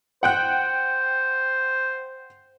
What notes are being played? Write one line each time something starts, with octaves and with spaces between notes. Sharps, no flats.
C5 F#5 G5 F#6